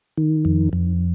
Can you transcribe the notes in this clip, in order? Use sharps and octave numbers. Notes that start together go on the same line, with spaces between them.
D#3
F2
F2